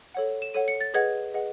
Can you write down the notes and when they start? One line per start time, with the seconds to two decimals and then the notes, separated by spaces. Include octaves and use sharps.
0.15 A4 C#5 F#5
0.42 E7
0.54 A4 C#5 F#5 D#7
0.68 C#7
0.81 A6
0.94 G#4 B4 D#5 F#5 G#6
1.34 G#4 B4 D#5 F#5